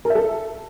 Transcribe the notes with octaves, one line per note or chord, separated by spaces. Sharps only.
A#4
E5
A4